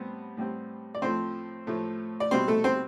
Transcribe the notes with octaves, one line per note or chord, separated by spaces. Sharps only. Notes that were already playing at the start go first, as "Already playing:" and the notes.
Already playing: A2 G3 B3 C4
A2 G3 C4
D5
A2 F3 A3 C4 C5
A2 F3 A3
D5
B2 G3 C4 C5
A3 A4
C4 C5